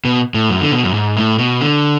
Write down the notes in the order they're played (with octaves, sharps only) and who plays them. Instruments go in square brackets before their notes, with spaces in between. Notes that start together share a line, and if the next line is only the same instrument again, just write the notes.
[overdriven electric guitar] B2
A2
F#2
D3
B2
F#2
G#2
A2
B2
D3